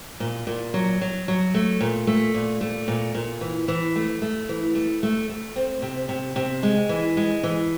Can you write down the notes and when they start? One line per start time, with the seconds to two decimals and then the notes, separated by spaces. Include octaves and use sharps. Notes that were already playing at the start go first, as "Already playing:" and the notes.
0.20 A#2
0.47 A#2
0.74 F#3
1.01 F#3
1.28 F#3
1.54 A3
1.81 A#2
2.07 A3
2.34 A#2
2.61 A3
2.88 A#2
3.15 A#2
3.41 E3
3.68 E3
3.96 A3
4.22 A3
4.49 E3
4.75 A3
5.03 A3
5.29 A3
5.56 C4
5.82 C3
6.09 C3
6.36 C3
6.63 G#3
6.89 E3
7.17 G#3
7.43 E3